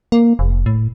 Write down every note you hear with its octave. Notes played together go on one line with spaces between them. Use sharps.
A#3
F1
A2